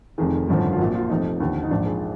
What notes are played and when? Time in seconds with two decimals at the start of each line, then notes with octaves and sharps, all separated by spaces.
0.18 F1 F2 D#3 G#4
0.48 G#1 F#2 D3 F3
0.72 F4
0.79 A#1 A#2 F3 F#4
0.95 F4
1.10 F1 F2 F3 D#4
1.40 D#2 D3 F3
1.63 D#4
1.71 A#1 G#2 F3 D4
1.86 G#4